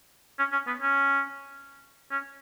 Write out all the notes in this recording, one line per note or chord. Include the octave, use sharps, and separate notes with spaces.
C#4
C#4
B3
C#4
C#4